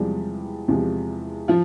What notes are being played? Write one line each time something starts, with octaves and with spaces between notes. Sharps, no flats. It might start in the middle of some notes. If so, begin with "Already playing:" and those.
Already playing: E2 C3 F3 G3 G#3 G4
E2 C3 F3 G#3
F3 F4